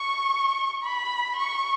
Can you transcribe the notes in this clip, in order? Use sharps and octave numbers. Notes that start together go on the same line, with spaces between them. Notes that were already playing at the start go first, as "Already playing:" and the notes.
Already playing: C#6
B5
C#6